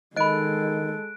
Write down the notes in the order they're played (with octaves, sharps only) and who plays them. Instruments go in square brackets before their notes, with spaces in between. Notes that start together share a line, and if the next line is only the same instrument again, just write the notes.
[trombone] D#3 [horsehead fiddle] G#3 A4 [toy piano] D#5 B5 [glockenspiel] F#6 D7